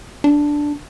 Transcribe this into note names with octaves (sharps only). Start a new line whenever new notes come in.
D4